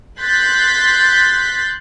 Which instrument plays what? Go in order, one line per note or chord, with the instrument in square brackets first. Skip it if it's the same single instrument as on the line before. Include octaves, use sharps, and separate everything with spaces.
[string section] C6 F#6 G6 A6 B6